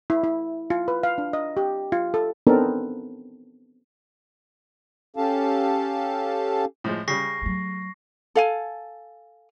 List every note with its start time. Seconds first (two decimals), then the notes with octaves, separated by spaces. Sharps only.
0.10 E4
0.24 E4
0.70 F4
0.88 B4
1.03 F5
1.18 D4
1.33 D#5
1.57 G4
1.92 F4
2.14 A4
2.47 B3 C4 D4 D#4 A4 A#4
5.16 C#4 G4 A4 F5 A5
6.84 A2 F3 G#3
7.08 C#3 G3 C#6 A#6 C7
7.42 F#3 A3
8.35 A4 F5 G#5